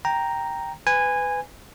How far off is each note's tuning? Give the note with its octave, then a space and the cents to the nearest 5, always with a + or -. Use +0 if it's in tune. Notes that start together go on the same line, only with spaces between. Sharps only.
G5 +0 A#5 +0
B4 +25 G#5 -15